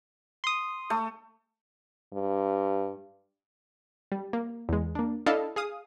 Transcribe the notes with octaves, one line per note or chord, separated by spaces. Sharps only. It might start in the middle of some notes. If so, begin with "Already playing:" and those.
C6 D#6
A3
G2
G3
A#3
E2 G#3
A#3 D4
D4 E4 A4 D#5 F5 A5
G#4 F5 D#6